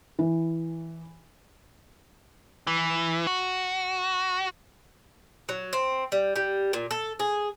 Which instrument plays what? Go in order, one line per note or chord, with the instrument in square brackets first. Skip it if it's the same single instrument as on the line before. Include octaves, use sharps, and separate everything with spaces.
[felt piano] E3
[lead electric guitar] E3
F#4
[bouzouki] F#3
C4
G3
G3
A#2
A4
G#4